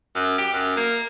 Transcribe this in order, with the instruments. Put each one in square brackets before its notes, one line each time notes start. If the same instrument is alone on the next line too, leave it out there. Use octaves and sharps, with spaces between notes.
[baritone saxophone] F#2
G4
F#2
A#3